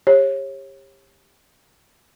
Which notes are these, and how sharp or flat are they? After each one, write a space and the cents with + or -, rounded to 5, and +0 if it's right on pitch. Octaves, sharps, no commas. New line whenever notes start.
G4 +25 C#5 -30